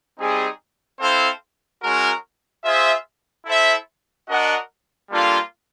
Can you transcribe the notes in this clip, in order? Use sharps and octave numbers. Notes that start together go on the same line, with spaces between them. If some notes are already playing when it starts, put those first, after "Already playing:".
G3 C4 D#4 G#4
C4 E4 A4 C5 F5
G#3 C#4 F#4 A#4
F4 G#4 C5 E5
E4 A4 C5 E5
D4 F#4 A#4 D#5 F#5
G3 A#3 D4 F4 A4